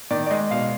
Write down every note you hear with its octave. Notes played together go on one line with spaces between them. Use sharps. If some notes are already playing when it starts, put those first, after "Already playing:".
D#3 D5
D5
G#3 D#5
B2 F5